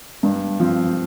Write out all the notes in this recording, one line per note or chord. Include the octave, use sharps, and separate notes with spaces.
G2
F3 C4